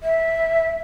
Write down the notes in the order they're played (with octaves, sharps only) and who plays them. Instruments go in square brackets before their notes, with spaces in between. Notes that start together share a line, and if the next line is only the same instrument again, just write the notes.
[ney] E5